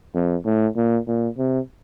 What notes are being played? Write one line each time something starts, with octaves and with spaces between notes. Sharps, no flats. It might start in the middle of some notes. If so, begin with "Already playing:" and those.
F2
A2
A#2
A#2
C3